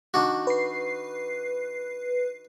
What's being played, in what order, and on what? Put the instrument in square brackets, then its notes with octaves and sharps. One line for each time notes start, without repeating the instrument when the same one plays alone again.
[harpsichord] D#3 D4 F#4
[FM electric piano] B4 C7